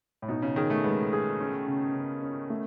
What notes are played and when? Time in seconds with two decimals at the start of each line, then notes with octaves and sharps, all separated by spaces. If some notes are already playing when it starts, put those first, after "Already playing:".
0.22 A2
0.28 B2 D#4
0.42 C#3
0.56 D#3 G#4
0.70 A3
0.84 G#3 B3
1.13 G#4
1.40 C#4
1.67 C#3
1.95 C#3
2.22 C#4
2.50 A3